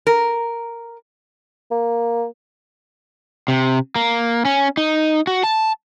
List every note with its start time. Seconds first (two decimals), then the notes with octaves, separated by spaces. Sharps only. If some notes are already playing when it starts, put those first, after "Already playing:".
0.07 A#4
1.71 A#3
3.48 C3
3.96 A#3
4.45 C#4
4.77 D#4
5.27 F#4
5.44 A5